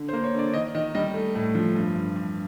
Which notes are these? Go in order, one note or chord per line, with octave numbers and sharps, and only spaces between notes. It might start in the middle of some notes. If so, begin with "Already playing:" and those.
Already playing: D3
C5
A#3
C#5
D3 D5
D#3 D#5
D#3 D#5
G3 D#5
A3
A2
F3
G2
G2
G2